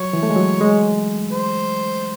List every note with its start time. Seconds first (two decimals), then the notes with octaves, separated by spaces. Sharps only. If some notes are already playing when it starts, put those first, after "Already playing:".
Already playing: F#3 C#5
0.13 E3
0.23 A3
0.30 G#3
0.36 F#3
0.61 G#3
1.32 C5